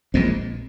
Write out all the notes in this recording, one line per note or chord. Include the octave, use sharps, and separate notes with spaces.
A#1 A#2 G#3 C4